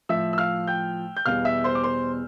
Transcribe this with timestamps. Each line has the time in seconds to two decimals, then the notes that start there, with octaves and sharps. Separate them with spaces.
0.09 A2 F3 E5 E6
0.33 E6
0.38 F5 F6
0.67 G5 G6
1.17 G6
1.26 E2 B2 G3 F5 F6
1.45 E5 E6
1.64 C5 C6
1.75 D6
1.84 C5 C6